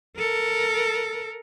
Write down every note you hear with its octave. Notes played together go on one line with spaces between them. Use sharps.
A4 A#4